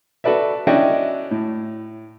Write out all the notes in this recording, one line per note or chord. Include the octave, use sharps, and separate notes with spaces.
F#4 A4 B4 D5 E5
C#4 D4 E4 F#4 D#5 G5
A2